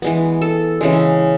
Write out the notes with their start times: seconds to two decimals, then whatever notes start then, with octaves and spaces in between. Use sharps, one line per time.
0.02 E3 G#3 B3
0.41 A4
0.81 C#3 E3 G#3